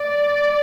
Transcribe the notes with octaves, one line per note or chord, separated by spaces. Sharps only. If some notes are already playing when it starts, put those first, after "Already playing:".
Already playing: D5